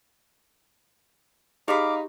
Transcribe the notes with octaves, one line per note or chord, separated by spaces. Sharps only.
D#4 G4 G#4 F5 B5 D6